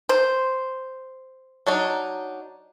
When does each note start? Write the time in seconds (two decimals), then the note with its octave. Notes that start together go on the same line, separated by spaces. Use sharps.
0.09 C5
1.67 F#3 D4 D#4